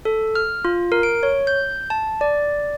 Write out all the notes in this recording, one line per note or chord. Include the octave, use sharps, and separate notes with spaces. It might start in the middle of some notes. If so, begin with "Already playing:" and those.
A4
F6
F4
A#4
D7
C#5
G6
A5
D5